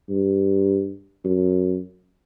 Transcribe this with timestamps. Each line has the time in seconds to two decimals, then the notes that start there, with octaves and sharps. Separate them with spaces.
0.09 G2
1.25 F#2